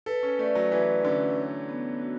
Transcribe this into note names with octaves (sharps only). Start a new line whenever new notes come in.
A4 B4
C#4
A3 D5
F#3
E3 B4
D3 C#4
C#5
B3
F#4